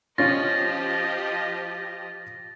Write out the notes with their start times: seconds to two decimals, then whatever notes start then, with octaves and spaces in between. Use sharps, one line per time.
0.18 F3 C#4 F4 G4 D#5 A6 A#6